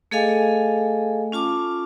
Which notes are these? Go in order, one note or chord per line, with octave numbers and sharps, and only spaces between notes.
A3 G#4 A4 D#5 F5 G#5
C#4 F4 A5 D6